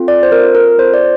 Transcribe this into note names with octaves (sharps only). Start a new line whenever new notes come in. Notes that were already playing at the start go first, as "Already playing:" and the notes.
Already playing: C4 F4 A4
D5
C5
C4 F4 A4 A#4
A#4
C4 F4 A4 C5
D5